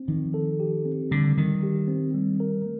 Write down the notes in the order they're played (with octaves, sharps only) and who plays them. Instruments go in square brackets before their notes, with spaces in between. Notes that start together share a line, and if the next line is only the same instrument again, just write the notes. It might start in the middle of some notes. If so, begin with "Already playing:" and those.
Already playing: [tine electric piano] C4
[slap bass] D#3 [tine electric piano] F3
[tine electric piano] A4
G4
C4
[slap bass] D3 [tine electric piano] G3
[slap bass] D#3 [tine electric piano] G3
[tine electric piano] G4
C4
G3
A#4
A3